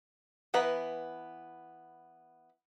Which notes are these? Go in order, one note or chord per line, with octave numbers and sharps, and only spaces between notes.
E3 B3 B4 A#5